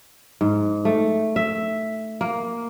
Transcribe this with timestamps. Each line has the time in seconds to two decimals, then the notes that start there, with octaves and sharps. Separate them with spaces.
0.41 G#2
0.85 A3
1.36 E5
2.21 A#3